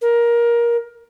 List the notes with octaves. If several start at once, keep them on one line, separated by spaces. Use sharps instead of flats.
A#4